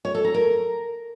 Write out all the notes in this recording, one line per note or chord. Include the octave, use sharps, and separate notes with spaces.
C#5
A4
A#5
A#4